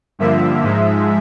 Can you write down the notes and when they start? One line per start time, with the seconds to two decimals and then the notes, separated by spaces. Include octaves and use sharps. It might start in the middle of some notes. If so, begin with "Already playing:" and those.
0.19 G2 D3 F3 A#3 E5
0.63 G#2 F3 G#3